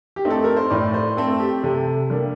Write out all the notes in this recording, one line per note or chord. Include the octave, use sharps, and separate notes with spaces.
G4
A3 C4 D#4
A4
A#4
C5
A2 D5
C5
A3 C4 A4
G4
C3 A4
G3 A#3 D4